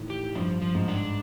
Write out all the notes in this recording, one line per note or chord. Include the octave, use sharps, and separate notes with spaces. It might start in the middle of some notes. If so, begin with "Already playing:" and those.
Already playing: A2 D#3 E3
G4
G2 F3
F3
G#2
D4